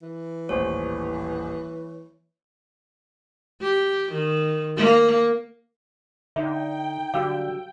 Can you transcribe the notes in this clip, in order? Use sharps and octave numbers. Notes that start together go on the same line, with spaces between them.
E3
D#1 A1 C5 C#5
G4
D#3
A#3
D3 D#4 E5 G5
D3 F#3 G3 F5 E6